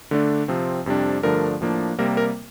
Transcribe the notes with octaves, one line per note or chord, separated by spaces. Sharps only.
D3 A3 D4
C3 F3 C4
F2 C3 G3 D4
G2 D3 F3 A3 D4 A#4
A2 F3 A#3 D4
C3 G3 A#3 A#4
A#4